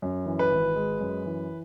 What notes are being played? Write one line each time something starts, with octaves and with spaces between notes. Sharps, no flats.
F#2
E3
B4
G#1
G#3
F#2
E3